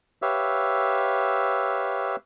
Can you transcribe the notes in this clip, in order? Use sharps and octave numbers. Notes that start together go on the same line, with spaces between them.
G4 B4 C#5 E5 F5 E6